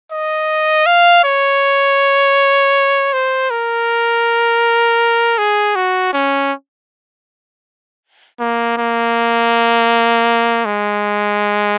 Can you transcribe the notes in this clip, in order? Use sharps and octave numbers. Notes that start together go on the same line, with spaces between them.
D#5
F5
C#5
C5
A#4
G#4
F#4
C#4
A#3
A#3
G#3